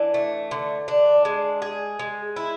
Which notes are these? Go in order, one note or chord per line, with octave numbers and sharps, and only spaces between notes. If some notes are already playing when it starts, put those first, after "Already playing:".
Already playing: E3 D4
A3
D3
D4
G#3
G#4
G#3
E4